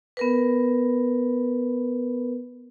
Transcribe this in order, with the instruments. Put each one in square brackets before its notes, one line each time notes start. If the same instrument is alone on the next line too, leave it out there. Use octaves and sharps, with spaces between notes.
[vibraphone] B3 A#4 B4